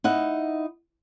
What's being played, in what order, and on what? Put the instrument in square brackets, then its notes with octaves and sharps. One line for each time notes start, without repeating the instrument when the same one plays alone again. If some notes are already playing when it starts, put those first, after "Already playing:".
[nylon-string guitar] D#4 E4 F#5